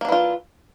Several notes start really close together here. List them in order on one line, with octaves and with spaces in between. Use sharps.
A#3 D4 E3 F4